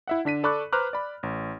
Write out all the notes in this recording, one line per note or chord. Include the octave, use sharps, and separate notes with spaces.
E4 E5 F#5
D3 D4 B6 D#7
A4 D5 B5 C#6 D6 F#6
B4 C5 A#5 D6 F6 F#6
D5 B5
A1